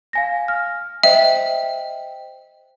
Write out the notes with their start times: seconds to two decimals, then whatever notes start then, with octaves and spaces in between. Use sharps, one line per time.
0.13 F5 G#5 A#6
0.48 F6
1.03 C5 D#5 E5 G5